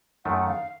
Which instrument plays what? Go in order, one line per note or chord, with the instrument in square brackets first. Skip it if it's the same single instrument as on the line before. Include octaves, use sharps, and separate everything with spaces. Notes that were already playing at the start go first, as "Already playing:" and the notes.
[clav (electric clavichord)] F#2 D#3 A3 [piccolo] F#5
[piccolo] F5